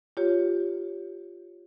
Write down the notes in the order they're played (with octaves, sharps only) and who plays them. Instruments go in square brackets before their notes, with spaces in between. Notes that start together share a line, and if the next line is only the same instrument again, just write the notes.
[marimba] F4 G4 C#5